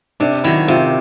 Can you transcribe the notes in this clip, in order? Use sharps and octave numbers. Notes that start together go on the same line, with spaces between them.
C3 D4
D#3 F#3 E4
C3 F4